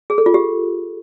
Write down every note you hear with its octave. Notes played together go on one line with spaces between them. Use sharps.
G#4
A4
F4
G4